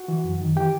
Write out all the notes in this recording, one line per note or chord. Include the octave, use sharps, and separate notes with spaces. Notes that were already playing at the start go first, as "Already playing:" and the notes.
Already playing: F#4 F#5
E3
F#2
D#3
E3 G4 G5